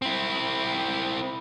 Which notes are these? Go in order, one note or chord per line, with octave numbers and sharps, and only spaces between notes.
C4 E4